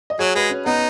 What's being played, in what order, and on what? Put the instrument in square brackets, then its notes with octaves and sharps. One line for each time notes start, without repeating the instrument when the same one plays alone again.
[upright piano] D#5
[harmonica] F#3 [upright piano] G#4 C#5
[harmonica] G#3 [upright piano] F#4 B4
[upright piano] C#4
[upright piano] B3 [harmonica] D#4